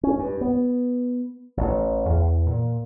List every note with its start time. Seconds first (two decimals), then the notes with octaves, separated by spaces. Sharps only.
0.03 C#4
0.19 G2
0.41 B3
1.57 A1
2.05 E2
2.46 A#2